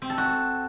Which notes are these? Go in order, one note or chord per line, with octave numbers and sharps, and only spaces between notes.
C4
A4
F#4